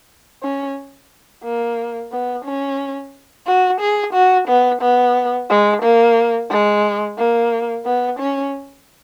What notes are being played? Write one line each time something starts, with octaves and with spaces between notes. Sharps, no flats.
C#4
A#3
B3
C#4
F#4
G#4
F#4
B3
B3
G#3
A#3
G#3
A#3
B3
C#4